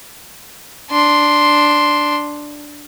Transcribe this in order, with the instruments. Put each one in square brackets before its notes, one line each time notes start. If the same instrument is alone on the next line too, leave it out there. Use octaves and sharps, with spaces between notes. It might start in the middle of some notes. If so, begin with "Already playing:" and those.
[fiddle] D4 C6